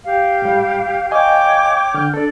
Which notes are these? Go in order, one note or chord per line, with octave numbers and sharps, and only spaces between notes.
G4 F5
A2 G3
C#5 D#5 F5 G5 G#5 D6
D3 F6 G6
D4 A4 D5